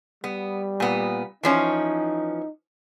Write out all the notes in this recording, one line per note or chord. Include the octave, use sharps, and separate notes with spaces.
G3 B3
A#2 B3
E3 F3 C#4 D#4